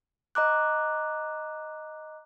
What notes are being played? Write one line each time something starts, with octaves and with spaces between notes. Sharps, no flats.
D#5 A#5 D6 F#6